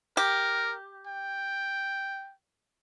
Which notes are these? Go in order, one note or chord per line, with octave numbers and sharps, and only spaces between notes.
G4 A#4
G5